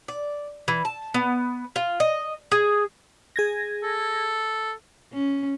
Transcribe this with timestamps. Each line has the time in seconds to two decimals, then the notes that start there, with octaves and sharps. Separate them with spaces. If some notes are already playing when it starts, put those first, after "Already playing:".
0.08 D5
0.68 E3
0.85 A5
1.14 B3
1.76 F4
2.00 D#5
2.52 G#4
3.36 G#4 G#6 A#6
3.83 A4
5.13 C#4